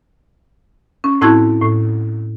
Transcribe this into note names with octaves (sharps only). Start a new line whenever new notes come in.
C#4
A2 C4 E4 F#4 A5 G#6
A2